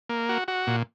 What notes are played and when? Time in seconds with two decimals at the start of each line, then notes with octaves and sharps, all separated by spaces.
0.09 A#3
0.29 F#4
0.48 F#4
0.67 A#2